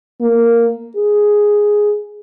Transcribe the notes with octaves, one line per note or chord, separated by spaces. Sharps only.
A#3
G#4